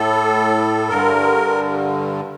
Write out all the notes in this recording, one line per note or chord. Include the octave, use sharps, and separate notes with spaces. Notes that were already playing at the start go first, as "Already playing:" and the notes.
Already playing: A2 A4
G2 D3 A#4